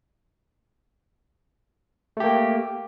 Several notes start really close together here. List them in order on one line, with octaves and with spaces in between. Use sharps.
A3 G4 A#3